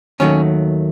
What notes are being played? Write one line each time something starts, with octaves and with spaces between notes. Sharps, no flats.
D#2 D#3 F#3 A3 C#4